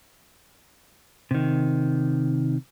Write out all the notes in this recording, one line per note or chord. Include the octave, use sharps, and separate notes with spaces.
C3 D#3